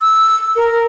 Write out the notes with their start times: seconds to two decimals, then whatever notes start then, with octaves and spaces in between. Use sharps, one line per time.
0.01 E6
0.56 A#4